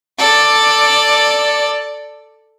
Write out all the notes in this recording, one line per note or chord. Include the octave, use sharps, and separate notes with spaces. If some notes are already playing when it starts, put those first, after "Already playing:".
A4 D5